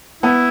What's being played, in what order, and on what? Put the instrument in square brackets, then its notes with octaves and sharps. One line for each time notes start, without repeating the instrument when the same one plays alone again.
[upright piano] B3 [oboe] E4